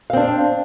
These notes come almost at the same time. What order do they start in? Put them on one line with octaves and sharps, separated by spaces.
F5 C4 D4